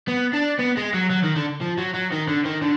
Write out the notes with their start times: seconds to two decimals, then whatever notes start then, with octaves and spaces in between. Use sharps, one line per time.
0.08 B3
0.33 D4
0.59 B3
0.77 G#3
0.94 F#3
1.10 F#3
1.23 D#3
1.36 D3
1.61 F3
1.78 F#3
1.94 F#3
2.12 D#3
2.28 D3
2.45 D#3
2.62 D3